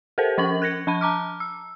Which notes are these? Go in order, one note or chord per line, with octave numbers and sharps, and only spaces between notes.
G4 A4 A#4 C5
F3 C#4 A#4 C#6 F#7
F#6 G#6 A#6 C#7
F3 A5 B5 D#7
A5 A#5 D6 F6
E6